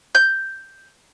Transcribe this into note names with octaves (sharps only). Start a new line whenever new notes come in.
G6